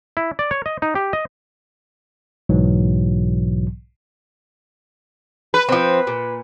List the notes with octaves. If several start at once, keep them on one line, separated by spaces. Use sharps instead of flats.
E4
D5
C#5
D#5
D#4
G4
D#5
B1 G#2 B2 E3 F#3
B4
F3 C4
A#2